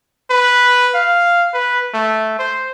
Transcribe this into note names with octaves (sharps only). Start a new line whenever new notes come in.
B4
F5
B4
A3
C5